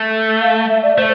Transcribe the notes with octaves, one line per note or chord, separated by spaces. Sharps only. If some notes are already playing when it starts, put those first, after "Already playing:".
Already playing: A3
F5
E5
D5
A3 C5